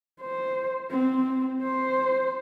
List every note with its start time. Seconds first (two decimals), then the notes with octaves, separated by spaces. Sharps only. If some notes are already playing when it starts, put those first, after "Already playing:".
0.21 C5
0.90 C4
1.63 C5